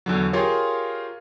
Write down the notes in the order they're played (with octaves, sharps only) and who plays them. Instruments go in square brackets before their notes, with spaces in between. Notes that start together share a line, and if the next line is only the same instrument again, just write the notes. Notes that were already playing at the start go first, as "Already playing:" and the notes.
[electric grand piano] E2 D3 F#3
F4 G4 G#4 A#4 C#5 F5